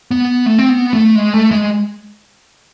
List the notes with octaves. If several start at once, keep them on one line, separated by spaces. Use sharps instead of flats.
B3
A3
C4
B3
A3
G#3
A3
G#3